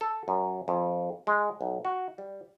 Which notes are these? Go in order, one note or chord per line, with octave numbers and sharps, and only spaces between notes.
A4
F#2
F2
G#3
B1
F#4
G3